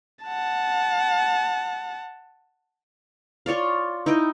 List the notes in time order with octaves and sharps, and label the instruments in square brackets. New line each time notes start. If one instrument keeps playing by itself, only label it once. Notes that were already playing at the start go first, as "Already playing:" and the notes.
[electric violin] F#5 A5
[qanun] F4 C#5 D5 F5
D#4 E4 D#5 G5